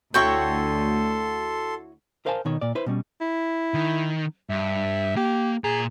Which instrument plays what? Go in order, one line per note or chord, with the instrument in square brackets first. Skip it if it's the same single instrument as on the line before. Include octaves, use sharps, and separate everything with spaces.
[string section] D2 [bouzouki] E4 F#4 C#5 [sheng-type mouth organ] A4 C6 [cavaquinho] G5 C#6
[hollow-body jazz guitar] A#4 C5 F5 G#5 A5
B2 D#3 C#5
A#2 D5
E4 B4 C5
B2 G3 C#4
[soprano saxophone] E4
[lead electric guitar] D#3
[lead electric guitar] G2 [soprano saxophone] E5
[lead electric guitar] A#3 [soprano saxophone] G4
[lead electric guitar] A#2 A#5 [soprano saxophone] G#4